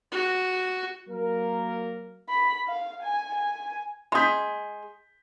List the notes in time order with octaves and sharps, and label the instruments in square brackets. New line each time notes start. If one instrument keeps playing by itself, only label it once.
[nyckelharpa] F#4
[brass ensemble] F#3 A#3 A#4
[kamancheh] B5
F5
G#5
G#5
[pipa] G#3 G#4 [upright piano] C6 G6 B6